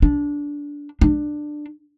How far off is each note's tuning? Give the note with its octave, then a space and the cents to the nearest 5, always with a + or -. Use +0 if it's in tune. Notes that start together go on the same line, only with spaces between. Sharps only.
D4 -15
D4 +15